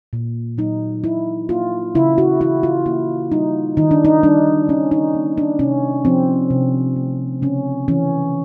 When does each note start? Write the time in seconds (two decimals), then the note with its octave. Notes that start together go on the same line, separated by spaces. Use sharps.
0.13 A#2
0.58 F#3 D#4
1.04 A#2 E4
1.49 A#3 F4
1.95 C#3 E4
2.18 F#4
2.40 E3 E4
2.63 F4
2.86 A#3 E4
3.32 G3 D#4
3.77 D#3 D#4
3.91 D4
4.05 D#4
4.23 G3 D4
4.68 D#3 C#4
4.91 D#4
5.15 A#3
5.38 D4
5.59 C3 C#4
6.05 F3 C4
6.50 C3
6.96 A3
7.42 C#3 C#4
7.88 E3 C#4